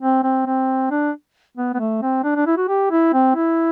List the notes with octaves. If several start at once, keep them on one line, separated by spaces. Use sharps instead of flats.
C4
C4
C4
D4
B3
B3
A3
C4
D4
D4
E4
F#4
G4
E4
C4
E4